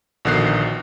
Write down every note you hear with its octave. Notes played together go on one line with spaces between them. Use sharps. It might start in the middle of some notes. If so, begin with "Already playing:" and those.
A#1 B2 D3 D#3 F#6 C7